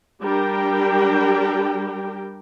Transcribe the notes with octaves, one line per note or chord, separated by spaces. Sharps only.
G3 D4 G4 A#4 G5